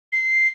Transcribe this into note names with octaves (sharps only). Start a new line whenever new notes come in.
C7